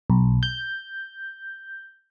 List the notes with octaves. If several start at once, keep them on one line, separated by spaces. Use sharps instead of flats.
B1
G6